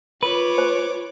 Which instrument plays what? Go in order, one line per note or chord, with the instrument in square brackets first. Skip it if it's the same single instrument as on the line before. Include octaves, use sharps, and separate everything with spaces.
[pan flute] F4 [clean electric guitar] B4 [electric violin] C#5 D6
[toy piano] C5